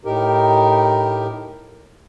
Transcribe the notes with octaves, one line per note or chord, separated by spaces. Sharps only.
A2 D#4 G4 A#4